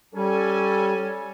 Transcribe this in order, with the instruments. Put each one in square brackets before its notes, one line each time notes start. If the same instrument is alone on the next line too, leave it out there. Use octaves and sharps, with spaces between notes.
[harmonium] G3 [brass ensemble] C#4 A4 G#5